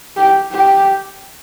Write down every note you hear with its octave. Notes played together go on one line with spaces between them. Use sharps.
G4
G4